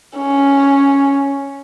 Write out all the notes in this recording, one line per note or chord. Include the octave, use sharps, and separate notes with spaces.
C#4